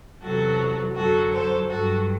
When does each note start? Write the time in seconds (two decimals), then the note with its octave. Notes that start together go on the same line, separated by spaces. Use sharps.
0.22 E2 C3 F#3 F#4 A4
0.96 F#2 D3 F#3 F#4 A4
1.33 A4 C5
1.69 G2 F#3 F#4 A4